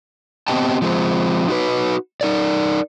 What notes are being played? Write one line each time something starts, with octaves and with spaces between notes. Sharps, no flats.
B3 C4 G4 D#5 G5 A5
F3 G#3 A3 C4
D#4 F#4 B4
D#4 A#4 D5